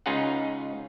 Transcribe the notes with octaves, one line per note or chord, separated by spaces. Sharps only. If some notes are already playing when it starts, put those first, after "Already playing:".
C#2 C#4 D#4 F4 G#4 F#5